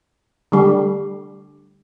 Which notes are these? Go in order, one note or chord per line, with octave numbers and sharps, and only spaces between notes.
D3 G3